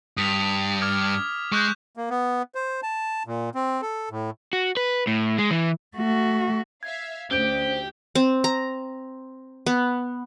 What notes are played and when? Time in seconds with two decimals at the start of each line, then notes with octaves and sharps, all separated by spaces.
0.17 G2 D#6 B6 F7
0.82 D6 F6 G#6
1.01 D6 F6 G#6
1.52 G#3 C#6 F#6 G6
1.97 A#3
2.10 B3
2.55 C5
2.83 A5
3.27 A#2
3.55 C4
3.82 A4
4.11 A2
4.53 F#4
4.77 B4
5.07 A2
5.38 G#3
5.51 E3
5.96 A3 F#4
6.83 E5 F5 G#6
7.31 D2 C#4 G4 C5 G6 D7
8.15 C4
8.44 A#5
9.66 B3